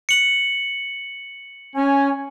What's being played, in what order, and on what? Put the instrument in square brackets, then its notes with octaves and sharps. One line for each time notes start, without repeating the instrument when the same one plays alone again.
[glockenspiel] C#7 F#7
[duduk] C#4 [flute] G#5